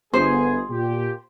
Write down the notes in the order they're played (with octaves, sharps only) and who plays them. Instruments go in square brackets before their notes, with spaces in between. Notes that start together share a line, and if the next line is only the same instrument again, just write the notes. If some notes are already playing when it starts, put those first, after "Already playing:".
[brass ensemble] G1 B3 G#4 [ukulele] C5
[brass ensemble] A#2 G4